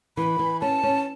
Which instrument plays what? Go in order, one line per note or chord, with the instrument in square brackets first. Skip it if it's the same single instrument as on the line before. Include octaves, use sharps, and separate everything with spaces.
[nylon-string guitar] E3 [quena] B5
[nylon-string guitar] E3
[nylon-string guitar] C#4 [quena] A5
[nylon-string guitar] C#4